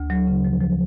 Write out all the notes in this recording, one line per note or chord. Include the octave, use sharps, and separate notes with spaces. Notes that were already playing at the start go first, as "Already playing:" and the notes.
Already playing: D2
F#3
C#3
F3
F3